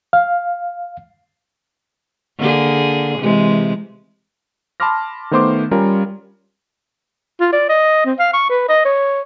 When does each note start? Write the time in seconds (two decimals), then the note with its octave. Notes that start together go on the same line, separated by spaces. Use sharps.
0.13 F5
2.38 D3 A#3 G#4
3.19 C3 E3 G#3
4.80 A5 B5 C6 D6 F6 A#6
5.31 D#3 A3 B3 C5 C6 D6
5.71 G3 C#4 F4 A#4
7.41 F4
7.53 D5
7.69 D#5
8.05 C4
8.19 F5
8.34 C#6
8.50 B4
8.69 D#5
8.85 C#5